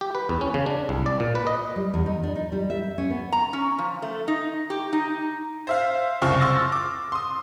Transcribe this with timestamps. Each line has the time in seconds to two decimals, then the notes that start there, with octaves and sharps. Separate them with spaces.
0.01 G4
0.15 B4
0.29 E2
0.41 C#4
0.54 C#3
0.66 D4
0.89 C2
1.06 D5
1.20 A#2
1.35 B4
1.47 D#5
1.76 G3
1.94 E2
2.06 D#4
2.23 D4
2.36 D#4
2.52 G3
2.70 E5
2.98 C#4
3.10 B3
3.32 A#5
3.53 C#4
3.78 F3
4.02 A3
4.28 D#4
4.70 G4
4.93 D#4
5.67 C5 E5 F5
6.22 F#1 C2 C4 F4 C#6 F6
6.39 C6 C#6 E6 F6 A6 A#6
6.72 D6
7.12 C6 D#6